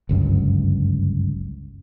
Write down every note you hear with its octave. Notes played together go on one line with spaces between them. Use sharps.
G1 C#2 F#2